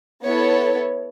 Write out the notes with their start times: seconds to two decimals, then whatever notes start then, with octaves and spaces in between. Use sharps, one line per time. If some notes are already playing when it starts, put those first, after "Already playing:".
0.24 B3 E4 A4 C#5